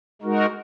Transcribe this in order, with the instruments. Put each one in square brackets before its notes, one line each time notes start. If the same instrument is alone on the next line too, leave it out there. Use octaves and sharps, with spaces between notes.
[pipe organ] G#3 D#4 F#4 A#4